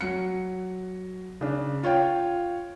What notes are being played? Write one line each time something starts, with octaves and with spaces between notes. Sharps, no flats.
F#3 C#7
C#3 D4
F4 C#5 F5 G5